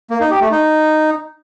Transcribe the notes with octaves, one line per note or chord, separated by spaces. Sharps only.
A#3
D#4
G4
A3
D#4